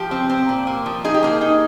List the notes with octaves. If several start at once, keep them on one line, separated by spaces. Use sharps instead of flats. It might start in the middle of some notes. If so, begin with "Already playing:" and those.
Already playing: F3 G4
C4
C4
A#2
A#3
F3
D#4 G#4
G4
A#3 G#4
D#4